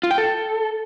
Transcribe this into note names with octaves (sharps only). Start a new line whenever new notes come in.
F4
G5
A4